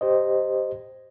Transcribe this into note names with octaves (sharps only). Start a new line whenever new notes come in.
G4 C5 D#5